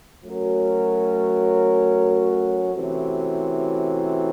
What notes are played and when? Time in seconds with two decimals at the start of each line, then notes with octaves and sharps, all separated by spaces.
0.25 F#3 A3 C#4 F#4 A#4
2.74 C3 E3 A3 C#4 F#4